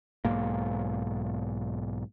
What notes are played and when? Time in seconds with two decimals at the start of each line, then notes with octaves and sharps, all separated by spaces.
0.25 B1 G#2 A#3